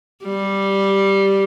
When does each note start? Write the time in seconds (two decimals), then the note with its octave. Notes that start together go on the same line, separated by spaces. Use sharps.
0.24 G3